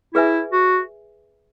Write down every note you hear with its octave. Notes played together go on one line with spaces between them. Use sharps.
E4 G#4 B4 E5 G#5
F#4